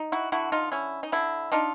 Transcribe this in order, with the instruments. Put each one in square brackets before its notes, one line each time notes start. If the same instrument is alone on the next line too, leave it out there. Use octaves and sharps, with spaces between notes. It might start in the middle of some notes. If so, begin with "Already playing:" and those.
Already playing: [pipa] D#4
E4 F#4
D3 E4 F#4
D#4 F4
C#4 E4
D#4
D3 E4
D4 D#4 F4